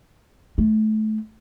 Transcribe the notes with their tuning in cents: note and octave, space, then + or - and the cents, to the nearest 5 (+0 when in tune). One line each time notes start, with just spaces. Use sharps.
A3 -25